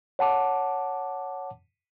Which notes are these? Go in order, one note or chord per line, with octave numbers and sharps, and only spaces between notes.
C#5 F#5 A5 D6